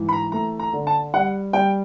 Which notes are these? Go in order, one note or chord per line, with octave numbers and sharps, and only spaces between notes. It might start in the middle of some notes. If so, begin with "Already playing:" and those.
Already playing: G#2 E3
B5
A#5
A3 A#5
A#5
D3
A5
G3 F#5
G3 G5